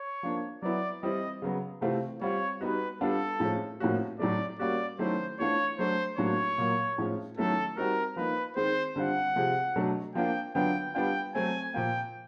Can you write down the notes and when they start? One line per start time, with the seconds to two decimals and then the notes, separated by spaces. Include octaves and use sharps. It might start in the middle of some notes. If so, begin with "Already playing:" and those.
Already playing: C#5
0.23 F3 A#3 D4
0.62 F#3 B3 E4 D5
1.03 E3 G3 C4 E4 D#5
1.42 C#3 F#3 B3
1.81 C3 E3 A3 C4 F4
2.21 G3 C4 F4 C#5
2.61 G3 B3 D#4 F#4 B4
3.01 G3 B3 D4 F4 A4
3.40 A2 F3 G#3 C#4
3.80 A2 F3 A#3 C#4 F#4
4.19 A2 F#3 A3 D5
4.59 G3 A#3 C#4 F#4 D5
4.99 D#3 F#3 A3 C#4 E4 C5
5.39 E3 A3 D4 F4 C#5
5.78 F#3 A3 D4 C5
6.18 A2 F#3 A#3 D4 F#4 C#5
6.58 A#2 F#3 A#3
6.98 A2 F3 G#3 C#4 F4
7.37 D#3 F#3 A3 C#4 E4 A4
7.77 G3 C4 D#4 F#4 A#4
8.16 F3 A#3 D#4 B4
8.56 D#3 G#3 C4 C5
8.96 D3 G3 C4 F4 F#5
9.36 C3 F3 G#3
9.76 B2 F#3 A3 D4 F#4
10.15 F3 A#3 D4 F4 G5
10.54 D3 F#3 B3 D4 F4 G5
10.95 G3 B3 D4 F4 G5
11.35 F#3 A3 C4 G#5
11.74 A#2 F3 A#3 G5